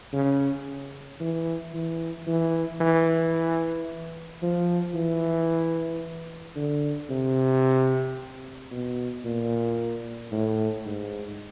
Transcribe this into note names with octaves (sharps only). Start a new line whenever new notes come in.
C#3
E3
E3
E3
E3
F3
E3
D3
C3
B2
A#2
A2
G#2